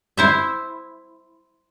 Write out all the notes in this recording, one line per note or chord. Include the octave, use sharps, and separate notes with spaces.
E4 C5 E5